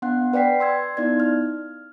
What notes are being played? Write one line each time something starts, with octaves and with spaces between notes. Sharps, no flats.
B3 D4 F#5 F#6
B4 D5 G5 B6 C7
C6 E6 G#6
B3 D#4 E4 D5 G#6
F6